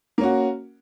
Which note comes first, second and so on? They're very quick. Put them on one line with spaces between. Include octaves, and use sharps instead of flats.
A#3 C#4 F#4